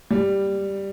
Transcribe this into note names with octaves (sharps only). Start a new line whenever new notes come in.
G3